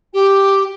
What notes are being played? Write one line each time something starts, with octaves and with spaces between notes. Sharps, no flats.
G4